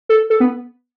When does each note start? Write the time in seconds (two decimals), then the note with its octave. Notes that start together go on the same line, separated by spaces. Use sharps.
0.09 A4
0.30 A4
0.40 B3